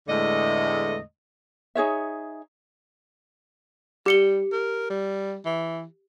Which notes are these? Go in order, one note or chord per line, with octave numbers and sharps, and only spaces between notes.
E2 A2 D3 G#3 A3 D#5
D#4 G#4 C#5 E5
G3 G4 C#7 G7
A#4
G3
E3